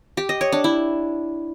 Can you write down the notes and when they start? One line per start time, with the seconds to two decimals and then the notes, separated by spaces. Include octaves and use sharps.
0.17 G4
0.29 D#5
0.41 C#5
0.52 D4
0.64 E4